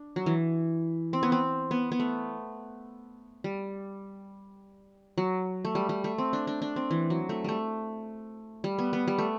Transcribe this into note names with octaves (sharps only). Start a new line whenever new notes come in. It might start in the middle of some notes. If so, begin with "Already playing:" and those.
Already playing: D4
F#3
E3
C4
B3
C4
B3
B3
A3
G3
F#3
A3
G3
G3
A3
C4
D4
D4
D4
C4
E3
F#3
A3
G3 A3
G3
B3
B3
G3
A3